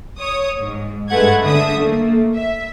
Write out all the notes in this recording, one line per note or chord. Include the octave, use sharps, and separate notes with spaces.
C#5 D#6
G#2
G2 G#3 A3 B4 F#5 G#6
D3 E5 D#6
A3 A#3
E5